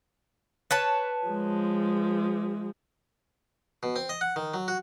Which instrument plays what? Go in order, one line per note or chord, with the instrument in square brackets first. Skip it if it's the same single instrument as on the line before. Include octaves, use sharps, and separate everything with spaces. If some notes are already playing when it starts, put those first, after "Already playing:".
[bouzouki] B4 C#5 A5
[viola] F3 G#3
[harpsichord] B2
C4
D#5
F#5
D#3
F#3
F#4